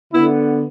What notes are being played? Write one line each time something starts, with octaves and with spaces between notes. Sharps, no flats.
D3 B3 E4